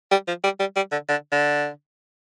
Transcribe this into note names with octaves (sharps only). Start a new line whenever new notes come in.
G3
F3
G3
G3
G3
D3
D3
D3